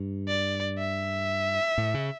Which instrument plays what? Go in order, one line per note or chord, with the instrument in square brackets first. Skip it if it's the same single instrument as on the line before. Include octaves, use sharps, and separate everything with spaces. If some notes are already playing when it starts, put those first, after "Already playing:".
Already playing: [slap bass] G2
[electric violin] D5
E5
[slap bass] A2
C#3